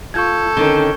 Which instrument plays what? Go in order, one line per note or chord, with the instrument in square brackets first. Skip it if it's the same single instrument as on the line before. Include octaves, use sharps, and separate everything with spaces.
[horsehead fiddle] F4 [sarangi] A4 [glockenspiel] C#6 G6 G#6
[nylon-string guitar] D3 D#3 [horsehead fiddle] C#4 G5 [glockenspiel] G7